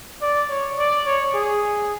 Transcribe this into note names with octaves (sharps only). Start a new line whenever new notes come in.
D5
C#5
D5
C#5
G#4